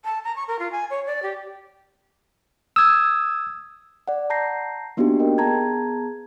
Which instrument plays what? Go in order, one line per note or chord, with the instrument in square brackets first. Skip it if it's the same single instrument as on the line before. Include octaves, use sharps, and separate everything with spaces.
[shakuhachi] A5
A#5
C#6
A#4
F4
G#5
C#5
D5
G4
[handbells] D#6 G#6 [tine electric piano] E6
[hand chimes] D5 F#5
A5 A#5 G6 A#6 C7
A#3 B3 D4 D#4 F#4 G4
A#4 D#5 G5
B3 G#4 A5 A#5 G#6